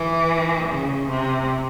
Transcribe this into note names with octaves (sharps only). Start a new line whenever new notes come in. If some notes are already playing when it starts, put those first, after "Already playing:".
Already playing: E3
C#3
C3